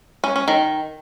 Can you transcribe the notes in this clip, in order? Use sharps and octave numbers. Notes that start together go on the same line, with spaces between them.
C#4
C#4
D#3